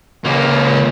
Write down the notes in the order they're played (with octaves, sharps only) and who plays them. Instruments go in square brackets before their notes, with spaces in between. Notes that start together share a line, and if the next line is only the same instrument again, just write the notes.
[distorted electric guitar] C#2 A#3